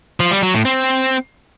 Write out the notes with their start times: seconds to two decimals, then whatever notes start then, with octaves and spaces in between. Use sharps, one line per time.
0.20 F3
0.31 G3
0.43 F#3
0.54 A2
0.65 C4